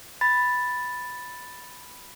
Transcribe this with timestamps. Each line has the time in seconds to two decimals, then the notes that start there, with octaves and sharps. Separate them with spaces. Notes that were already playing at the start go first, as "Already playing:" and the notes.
0.21 B5 A6